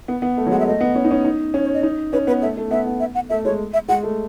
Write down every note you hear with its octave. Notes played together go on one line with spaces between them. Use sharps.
B3
B3
A3
F#3
G#3 F#5
E5
A3 D#5
B3
C#4
D#4
C#4
D#4
C#4 C#5
C#5
D#5
D#4
C#4 B4
B3 B4
A3 E5
A3
B3 E5
B3
E5
F#5
A3 E5
G#3 C#5
E5
G#3 F#5
A3